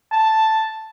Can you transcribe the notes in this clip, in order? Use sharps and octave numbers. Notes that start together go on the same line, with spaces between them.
A5